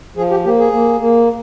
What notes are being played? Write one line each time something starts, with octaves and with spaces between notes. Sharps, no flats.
F3 G#4
G4
A#3 G4
G#4
A#3
A#3